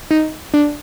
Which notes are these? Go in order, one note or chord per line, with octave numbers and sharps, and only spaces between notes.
D#4
D4